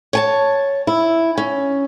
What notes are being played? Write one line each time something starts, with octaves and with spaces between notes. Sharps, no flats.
C#5 G#5 A5
E4
C#4